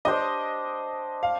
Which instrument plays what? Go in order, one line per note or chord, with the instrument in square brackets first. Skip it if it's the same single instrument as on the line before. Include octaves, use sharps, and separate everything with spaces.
[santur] D4 G4 C5 [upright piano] D#5
[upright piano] F5